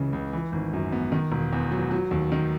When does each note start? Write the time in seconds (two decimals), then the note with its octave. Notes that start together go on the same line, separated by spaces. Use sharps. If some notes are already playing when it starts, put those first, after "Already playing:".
Already playing: C#2 C#3 E3
0.13 C#2
0.33 E3
0.52 G#1
0.73 F#2
0.92 B3
1.12 D#3
1.32 E1
1.53 E2
1.72 F#3
1.91 F#3
2.11 D#2
2.32 D#3